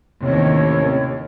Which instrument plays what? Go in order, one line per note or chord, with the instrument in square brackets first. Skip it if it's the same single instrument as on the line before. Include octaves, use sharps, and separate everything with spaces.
[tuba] A1 [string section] D#2 [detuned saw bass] C3 [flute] C#5